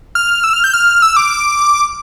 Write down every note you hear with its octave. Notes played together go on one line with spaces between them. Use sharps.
F6
E6
F6
G6
F6
E6
D6